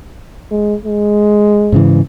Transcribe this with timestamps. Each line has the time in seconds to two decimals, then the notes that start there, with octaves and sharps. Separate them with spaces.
0.51 G#3
0.85 G#3
1.72 G#2 C#3 E3